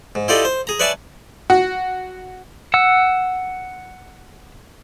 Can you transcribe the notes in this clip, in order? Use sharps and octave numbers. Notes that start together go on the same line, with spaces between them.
G#2
E4 F4 G4 A4 D5 D#5
C5
G#4 A#5
B4 C#5 D5 E5 G#5 A5
F#4
F#5 E6